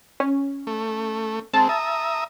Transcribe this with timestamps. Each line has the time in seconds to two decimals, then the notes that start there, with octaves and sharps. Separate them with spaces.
0.20 C#4
0.67 A3
1.54 G#3 C4 A5
1.69 E5 A#5 D#6